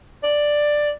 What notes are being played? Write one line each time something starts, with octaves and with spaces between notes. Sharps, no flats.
D5